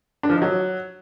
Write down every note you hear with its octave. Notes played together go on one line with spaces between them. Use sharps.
D4
F3
D#4
F#3